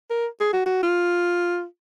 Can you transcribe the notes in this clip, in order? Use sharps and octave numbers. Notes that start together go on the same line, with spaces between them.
A#4
G#4
F#4
F#4
F4